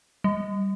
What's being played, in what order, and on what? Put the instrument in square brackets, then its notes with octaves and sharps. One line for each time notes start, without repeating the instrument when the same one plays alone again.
[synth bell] G3